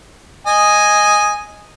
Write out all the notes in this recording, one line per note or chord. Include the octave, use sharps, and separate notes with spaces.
D#5 G#5